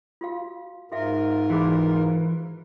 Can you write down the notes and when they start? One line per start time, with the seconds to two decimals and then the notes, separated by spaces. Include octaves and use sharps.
0.21 F4 F#4 F5
0.92 G#2 F4 F#4 A#4 E5 F5
1.50 E3 F#4 G#4 B5